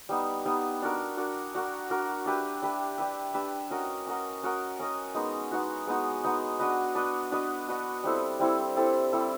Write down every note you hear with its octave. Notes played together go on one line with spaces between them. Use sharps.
G3 B3 D#4
G3 B3 D#4
D4 F#4 A#4
D4 F#4 A#4
D4 F#4 A#4
D4 F#4 A#4
D4 G4 B4 E5
D4 G4 B4 E5
D4 G4 B4 E5
D4 G4 B4 E5
C#4 F#4 A#4 D#5
C#4 F#4 A#4 D#5
C#4 F#4 A#4 D#5
C#4 F#4 A#4 D#5
G#3 B3 D#4 F#4
G#3 B3 D#4 F#4
G#3 B3 D#4 F#4
G#3 B3 D#4 F#4
D4 F#4 B4 D#5
D4 F#4 B4 D#5
D4 F#4 B4 D#5
D4 F#4 B4 D#5
G3 C4 E4 A4
G3 C4 E4 A4
G3 C4 E4 A4
G3 C4 E4 A4